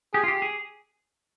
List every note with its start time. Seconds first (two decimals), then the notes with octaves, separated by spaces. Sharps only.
0.14 G4 G#4
0.24 F4
0.28 G4
0.42 G#4